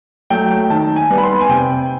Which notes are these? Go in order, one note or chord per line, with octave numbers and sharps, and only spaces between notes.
F#3 A3 G5
D#3 A5
G#5
G3 B3
B5
C6
G#5
C3 G5